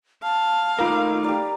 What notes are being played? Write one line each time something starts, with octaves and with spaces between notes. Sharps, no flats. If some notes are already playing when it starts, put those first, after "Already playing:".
F5 A5
A3 A#3 D#4 F4 A#4 B5 D6
G4 D5 A#5